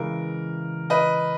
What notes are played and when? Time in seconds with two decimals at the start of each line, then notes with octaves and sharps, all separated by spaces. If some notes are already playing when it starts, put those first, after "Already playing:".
Already playing: C#3 E3 G#3 A#4
0.90 B4 D#5